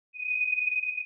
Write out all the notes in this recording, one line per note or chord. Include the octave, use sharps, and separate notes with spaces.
D#7